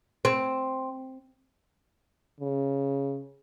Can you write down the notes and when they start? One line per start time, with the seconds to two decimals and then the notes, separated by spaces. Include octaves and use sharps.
0.25 C4
2.40 C#3